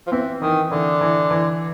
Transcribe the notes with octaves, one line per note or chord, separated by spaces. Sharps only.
F3
E3 C4
D#3 E3
D3 E3
E3
E3